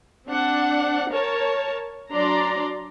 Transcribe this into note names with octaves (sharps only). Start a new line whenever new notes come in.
C4 D4 F#5
A#4 C#5 A5
F#3 D4 D5 A#5 C6